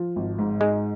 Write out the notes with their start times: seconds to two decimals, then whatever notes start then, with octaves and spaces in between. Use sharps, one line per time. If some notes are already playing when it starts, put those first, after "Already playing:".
Already playing: F3
0.16 G#1
0.38 G#2
0.60 G#3 D#4